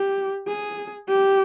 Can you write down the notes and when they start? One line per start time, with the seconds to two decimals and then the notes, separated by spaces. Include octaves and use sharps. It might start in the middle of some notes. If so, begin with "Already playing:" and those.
Already playing: G4
0.48 G#4
1.09 G4